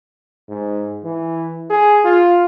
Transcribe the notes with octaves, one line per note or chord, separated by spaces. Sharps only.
G#2
E3
G#4
F4